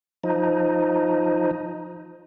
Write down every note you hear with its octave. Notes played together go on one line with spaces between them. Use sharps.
F3 D#4